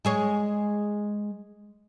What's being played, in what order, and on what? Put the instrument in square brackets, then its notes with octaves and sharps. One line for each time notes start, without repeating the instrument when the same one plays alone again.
[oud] G#3 G#4 C#5